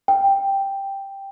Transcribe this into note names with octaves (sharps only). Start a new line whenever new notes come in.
G5